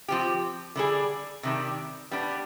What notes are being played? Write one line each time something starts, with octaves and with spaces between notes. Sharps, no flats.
F3 C4 G4
D3 G3 D4 G#4
C3 D#3 G3 D4
G3 B3 D4